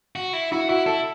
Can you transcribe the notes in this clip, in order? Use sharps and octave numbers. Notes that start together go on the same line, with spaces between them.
F#4
E4
E4 F#4
E4 F#4
E4 A4